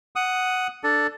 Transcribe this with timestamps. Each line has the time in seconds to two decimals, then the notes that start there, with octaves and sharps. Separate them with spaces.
0.16 F#5 D#6
0.84 D4 A4